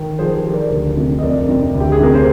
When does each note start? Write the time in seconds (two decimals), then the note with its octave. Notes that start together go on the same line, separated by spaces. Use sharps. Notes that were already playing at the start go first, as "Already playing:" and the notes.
Already playing: D#3
0.19 F3 G#4 C5
0.37 G4 A#4
0.45 F3
0.53 A#4 D5
0.71 D2
0.97 C3
1.19 D#5
1.23 F2 A#4 D5
1.49 C3
1.75 D2
1.80 G4
1.92 G#4
2.00 C3 A#4
2.15 C5